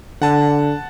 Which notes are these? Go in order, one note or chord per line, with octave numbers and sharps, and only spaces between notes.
D3 F#5 A5